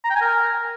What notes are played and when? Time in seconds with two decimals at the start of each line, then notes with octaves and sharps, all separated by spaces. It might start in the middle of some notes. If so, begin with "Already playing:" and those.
0.04 A#5
0.10 G5
0.16 G#5
0.21 A#4